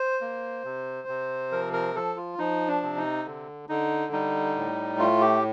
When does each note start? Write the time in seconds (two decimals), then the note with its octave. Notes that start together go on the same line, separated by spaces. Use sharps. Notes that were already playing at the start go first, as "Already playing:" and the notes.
Already playing: C5
0.21 A#3
0.64 C3
1.08 C3
1.51 F3 A#4
1.73 A#4
1.95 F3 A4
2.16 F4
2.38 F3 D#4
2.68 D4
2.83 C3
2.97 D#4
3.25 D3
3.69 D3 D#4
4.12 G3 D#4
4.56 A2
4.99 A3 F4
5.21 G4